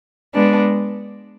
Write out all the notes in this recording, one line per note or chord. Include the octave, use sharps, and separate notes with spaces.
G#3 B3 D4